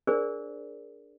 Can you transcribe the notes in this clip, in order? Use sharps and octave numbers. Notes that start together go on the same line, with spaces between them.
D4 G#4 A#4 C5 D5